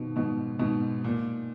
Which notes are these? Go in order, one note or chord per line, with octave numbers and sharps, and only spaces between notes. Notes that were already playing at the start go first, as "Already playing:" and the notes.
Already playing: B2 D#3 F3
G#2 B2
G#2 B2
A#2